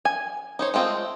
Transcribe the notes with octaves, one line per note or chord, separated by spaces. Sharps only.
G#5
D#4 C5 C#5
G#3 A3 C4 F4 D#5